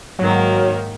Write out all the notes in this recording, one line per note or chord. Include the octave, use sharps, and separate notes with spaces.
G#2 D#3 F#3 A#3